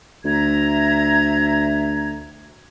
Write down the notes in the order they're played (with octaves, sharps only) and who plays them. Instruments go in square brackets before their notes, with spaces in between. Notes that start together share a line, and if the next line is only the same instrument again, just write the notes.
[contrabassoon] D2 [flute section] E5 A#5 G#6